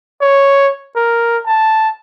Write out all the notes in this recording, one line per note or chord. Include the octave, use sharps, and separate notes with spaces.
C#5
A#4
A5